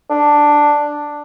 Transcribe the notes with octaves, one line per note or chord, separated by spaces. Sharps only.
D4